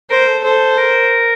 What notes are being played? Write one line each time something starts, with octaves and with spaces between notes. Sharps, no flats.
A#4 C5
A4
A4 C5
A#4